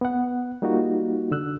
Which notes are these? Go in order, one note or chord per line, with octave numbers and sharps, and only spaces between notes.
B3 F#5
G3 A#3 D#4 F4 F#4
D3 E6 F#6